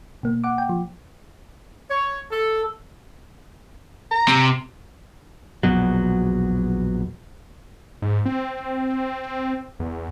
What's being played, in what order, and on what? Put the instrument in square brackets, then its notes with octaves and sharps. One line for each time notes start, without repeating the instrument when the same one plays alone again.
[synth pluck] B2 A#3
F#5 D6
G5
F3
[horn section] C#5
A4
[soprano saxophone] A#5
[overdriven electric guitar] C3
[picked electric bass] A#1 E2 B2 F#3
[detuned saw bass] G#2
C4
E2